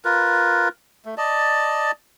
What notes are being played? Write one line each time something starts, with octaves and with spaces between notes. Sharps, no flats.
F4 A#4 B4
A3
D5 D#5 A5